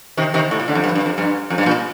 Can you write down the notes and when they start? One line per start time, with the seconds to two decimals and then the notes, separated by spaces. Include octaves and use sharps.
0.17 C3 D#3
0.34 C3 D#3
0.51 A2
0.60 A#2
0.68 D3
0.75 F2
0.84 G2
0.95 G2
1.06 F2
1.18 G2
1.50 F2
1.58 G2
1.66 A#2